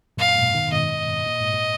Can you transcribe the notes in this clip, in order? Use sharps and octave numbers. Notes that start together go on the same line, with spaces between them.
F#2 A#2 F5
G#2 B2
B2 D#3
G#2 B2 D#5
A#2
G#2
A#2